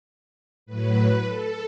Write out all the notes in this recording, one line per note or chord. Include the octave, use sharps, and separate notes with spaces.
A2 F#3 B4
A4